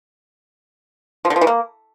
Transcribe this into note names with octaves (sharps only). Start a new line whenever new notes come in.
F3
D3
F3
E3
A#3